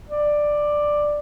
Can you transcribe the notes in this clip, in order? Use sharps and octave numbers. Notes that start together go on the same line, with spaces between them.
D5